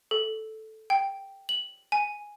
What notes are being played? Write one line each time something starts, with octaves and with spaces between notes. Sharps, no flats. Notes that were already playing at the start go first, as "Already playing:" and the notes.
A4
G5
F#7
G#5